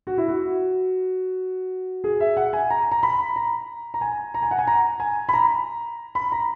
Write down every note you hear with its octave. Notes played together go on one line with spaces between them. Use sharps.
F#4
E4
F#4
G#4
E5
F#5
G#5
A#5
A#5
B5
A#5
A#5
G#5
A#5
G#5
F#5
G#5
A#5
G#5
B5
A#5
B5
A#5